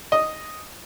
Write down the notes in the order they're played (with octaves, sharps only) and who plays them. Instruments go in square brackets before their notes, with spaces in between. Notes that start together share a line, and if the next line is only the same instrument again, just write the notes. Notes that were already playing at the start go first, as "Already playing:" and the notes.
[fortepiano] D#5